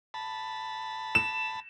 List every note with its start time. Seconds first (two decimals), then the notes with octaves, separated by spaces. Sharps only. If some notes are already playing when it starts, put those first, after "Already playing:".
0.14 A5 B5
1.15 E7